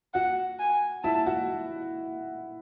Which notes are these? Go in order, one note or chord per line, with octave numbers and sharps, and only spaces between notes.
F#4 F#5
G#5
E4 A5
F#4